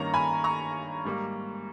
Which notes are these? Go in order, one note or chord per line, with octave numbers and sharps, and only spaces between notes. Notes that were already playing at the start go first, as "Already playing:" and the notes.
Already playing: G2 D#3 A#3 C#4 A#5 C#6
G#5 B5
A#5 C#6
G#2 G3 A#3